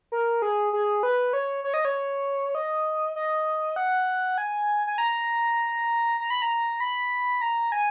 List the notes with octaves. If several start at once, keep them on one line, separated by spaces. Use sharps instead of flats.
A#4
G#4
G#4
B4
C#5
C#5
D#5
C#5
D#5
D#5
F#5
G#5
G#5
A#5
A#5
B5
A#5
B5
A#5
G#5